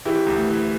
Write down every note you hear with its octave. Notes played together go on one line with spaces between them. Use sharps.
E3 E4 G4
D2
E3